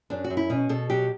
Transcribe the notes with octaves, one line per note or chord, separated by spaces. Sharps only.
F#2 D4
F#4
F#2
E4
B2 C#4
B2 A4
F#3 G4